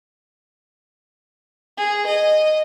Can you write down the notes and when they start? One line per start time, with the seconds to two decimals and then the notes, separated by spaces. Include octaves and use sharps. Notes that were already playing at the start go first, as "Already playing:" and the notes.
1.77 G#4
2.06 D#5